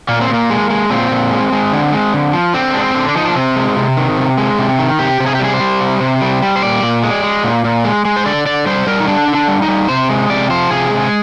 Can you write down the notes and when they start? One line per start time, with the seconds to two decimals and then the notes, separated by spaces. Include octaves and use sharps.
0.09 A#2 A#3
0.21 C4
0.29 A#2 A#3
0.50 G#3
0.70 G#3
0.90 A#2 C4
1.11 A#2
1.31 G#3
1.52 G#3
1.72 D3
1.93 G#3
2.14 D3
2.33 F3
2.54 D3 C4
2.73 G#3 D4
2.81 C4
2.95 D3
3.09 D4
3.15 F3 D#4
3.25 D4
3.36 C3 C4
3.56 G#3
3.77 C3
3.97 D#3
4.17 C3
4.38 G#3
4.58 C3
4.79 D#3
4.99 C3 G4
5.20 C3
5.26 G#4
5.35 G4
5.39 G3 G#4
5.54 C5
5.60 G3
5.81 C3
6.01 C3
6.21 G3
6.42 G3
6.56 C5
6.62 A#2 D5
6.83 A#2
7.03 G#3
7.23 G#3
7.44 A#2
7.65 A#2
7.85 G#3
8.05 G#3
8.16 C5
8.25 D3 D5
8.46 D3 D5
8.66 G3 C5
8.87 G3 A#4
9.00 D#4
9.07 D3 D4
9.28 D3
9.35 D4
9.48 G3
9.62 D#4
9.68 G3
9.89 C3 C5
10.10 G#3
10.29 C3 D5
10.50 F3 C5
10.70 C3 G#4
10.91 G#3